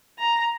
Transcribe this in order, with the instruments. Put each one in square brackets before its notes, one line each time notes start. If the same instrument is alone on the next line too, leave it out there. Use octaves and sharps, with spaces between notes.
[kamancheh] A#5